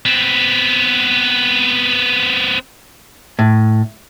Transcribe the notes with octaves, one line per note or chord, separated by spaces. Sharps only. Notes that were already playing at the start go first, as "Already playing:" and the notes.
B3 C4
A2